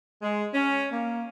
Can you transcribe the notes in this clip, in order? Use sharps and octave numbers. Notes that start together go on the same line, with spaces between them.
G#3
C#4
A#3